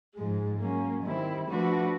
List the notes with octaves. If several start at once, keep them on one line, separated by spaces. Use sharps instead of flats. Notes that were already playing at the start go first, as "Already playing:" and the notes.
G#2 F3 G#3
F#3 A#3 C#4
D#3 G3 C4 E4
F3 A3 D4 F#4 B4